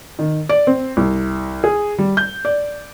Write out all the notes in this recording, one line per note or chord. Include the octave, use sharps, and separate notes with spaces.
D#3
D5
C4
C2
G#4
G3
G6
D5